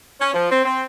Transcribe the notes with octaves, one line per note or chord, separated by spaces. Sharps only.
C#4
F3
C4
C4